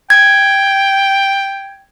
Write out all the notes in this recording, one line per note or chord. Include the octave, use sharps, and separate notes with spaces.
G5 G#6